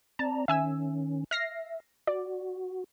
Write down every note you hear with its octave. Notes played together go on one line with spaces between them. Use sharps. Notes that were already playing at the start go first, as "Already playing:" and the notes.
C4 D5 A5 A#5
D#3 C#4 E5 G#5 E6
E5 F6 A#6 C7
F#4 D5